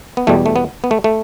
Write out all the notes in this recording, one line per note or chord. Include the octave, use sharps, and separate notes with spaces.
B3
E2 B2 G3 A3
A3
B3
B3
A3
A3